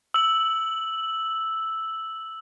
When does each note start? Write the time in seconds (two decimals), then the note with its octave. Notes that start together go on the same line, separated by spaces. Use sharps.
0.14 E6 F#7